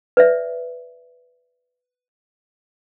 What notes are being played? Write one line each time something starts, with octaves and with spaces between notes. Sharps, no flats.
B4 D5 E5